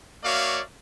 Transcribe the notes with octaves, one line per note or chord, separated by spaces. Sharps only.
A#3 F#4 C#5 D5 E5 F5